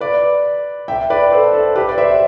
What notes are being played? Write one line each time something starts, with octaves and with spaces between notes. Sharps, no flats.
B4 D5
E5 G5
B4 D5
A4 C5
A4
G4 B4
D5
C5 E5